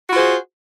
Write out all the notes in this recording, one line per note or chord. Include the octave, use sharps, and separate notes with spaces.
F4 F#4 G#4 C5